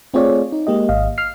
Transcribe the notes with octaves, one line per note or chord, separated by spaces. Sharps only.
A3 C4 F4 G#4 C#5 D5
D#4
G#3 A#3 G4 D#5
G#1 D#5 F5
F6 C7